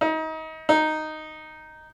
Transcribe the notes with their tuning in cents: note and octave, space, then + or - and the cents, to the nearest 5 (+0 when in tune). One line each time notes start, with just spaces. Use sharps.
D#4 +30
D#4 -5